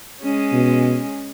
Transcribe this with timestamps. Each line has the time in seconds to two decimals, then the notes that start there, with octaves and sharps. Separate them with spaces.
0.21 G#3 C#4
0.52 B2